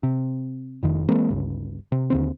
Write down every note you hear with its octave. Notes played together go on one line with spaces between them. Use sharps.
C3
F1 F2 D#3
E3 G#3 A#3 C4
G1 C#2
C3
D#2 D3 C4